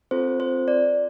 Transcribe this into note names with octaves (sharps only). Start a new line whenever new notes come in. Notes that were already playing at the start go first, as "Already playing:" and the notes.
C4 F4 A4 C5
C5
D5